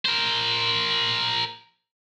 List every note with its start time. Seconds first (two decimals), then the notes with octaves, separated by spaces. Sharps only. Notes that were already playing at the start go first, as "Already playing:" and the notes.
0.06 A#4 C5